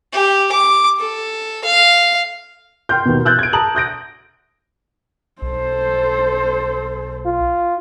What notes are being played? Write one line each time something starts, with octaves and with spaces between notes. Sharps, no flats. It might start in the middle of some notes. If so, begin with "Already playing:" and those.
G4
D6
A4
F5
G5 C6 F6 G6
D#2 B2
E6 F#6 G6 A6
G#6 D7
A5 A#5 D#6 F#7
D#6 G6 A#6 D7
B1 A4 C5
F4